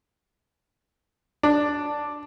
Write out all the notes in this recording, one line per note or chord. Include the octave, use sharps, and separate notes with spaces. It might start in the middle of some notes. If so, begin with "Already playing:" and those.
D4